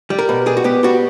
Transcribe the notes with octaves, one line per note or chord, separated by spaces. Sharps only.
G3
A#4
B2
G3 G#4
F#4
B3 G4
G3 F#4